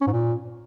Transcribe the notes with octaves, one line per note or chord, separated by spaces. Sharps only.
C#4
G#2
A#2